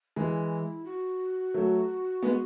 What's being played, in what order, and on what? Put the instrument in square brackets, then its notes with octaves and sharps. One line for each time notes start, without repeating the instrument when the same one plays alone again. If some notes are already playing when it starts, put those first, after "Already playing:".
[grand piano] E3 G#3 [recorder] E4
[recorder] F#4
[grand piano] F#3 A3
G#3 B3